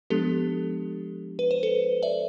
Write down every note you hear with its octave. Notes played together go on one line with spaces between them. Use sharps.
F3 G#3 B3 D4 G4 A4
B4
C5
A4 B4
D5 E5